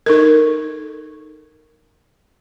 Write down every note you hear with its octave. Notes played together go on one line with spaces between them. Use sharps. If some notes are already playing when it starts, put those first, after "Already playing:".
D#4 A4 A#4